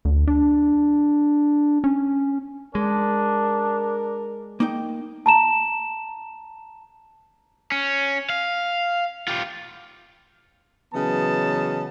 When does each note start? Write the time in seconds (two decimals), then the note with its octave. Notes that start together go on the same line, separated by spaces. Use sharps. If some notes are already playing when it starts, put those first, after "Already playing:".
0.05 D2
0.27 D4
1.84 C#4
2.75 G#3 D4 A#4
4.60 A#3 D#4 G5
5.26 A5 A#5 E7
7.72 C#4
8.30 F5
9.28 F4 G4
10.94 C#3 E3 F#3 B3 D#5 A5